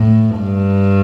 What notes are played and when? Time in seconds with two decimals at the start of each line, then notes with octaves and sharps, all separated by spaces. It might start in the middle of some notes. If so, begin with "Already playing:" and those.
Already playing: A2
0.38 G2